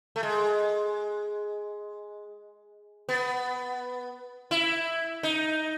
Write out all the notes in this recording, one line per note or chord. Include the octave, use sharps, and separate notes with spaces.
A3
G#3
B3
E4
D#4